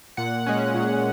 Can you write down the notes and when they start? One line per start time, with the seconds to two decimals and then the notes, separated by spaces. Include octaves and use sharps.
0.17 A#2 F#5
0.46 G#3 C#4
0.74 A#2